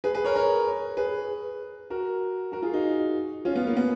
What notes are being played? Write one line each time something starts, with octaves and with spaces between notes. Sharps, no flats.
G#4 B4
G#4 B4
A#4 C#5
A#4 C#5
G#4 B4
F#4 A#4
F#4 A#4
F4 G#4
D#4 F#4
C#4 F4
B3
A#3
B3